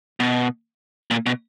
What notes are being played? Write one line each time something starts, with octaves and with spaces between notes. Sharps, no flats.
B2
A#2
B2